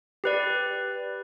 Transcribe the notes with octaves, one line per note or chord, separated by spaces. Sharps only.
G4 B4 D5